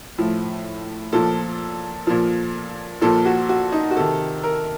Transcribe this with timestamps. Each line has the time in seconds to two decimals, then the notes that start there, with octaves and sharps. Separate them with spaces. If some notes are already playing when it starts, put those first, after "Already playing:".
0.18 A2 F3
1.13 A#2 F3 A4
2.07 A#2 F3
3.01 A#2 F3 A4
3.25 F#4
3.49 F#4
3.72 D#4
3.91 F#4
3.96 C3 D#3 A4
4.44 A#4